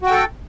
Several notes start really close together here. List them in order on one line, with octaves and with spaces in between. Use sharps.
F#4 G5 A4